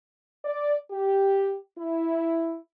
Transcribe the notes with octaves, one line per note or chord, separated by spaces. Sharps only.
D5
G4
E4